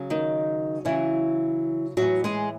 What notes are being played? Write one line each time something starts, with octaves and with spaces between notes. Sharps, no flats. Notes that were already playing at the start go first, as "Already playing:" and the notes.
Already playing: C#3 F#3
D#3 D#4
C#3 E3 F#3 E4
A2 E3 F#3 F#4
G#3 G#4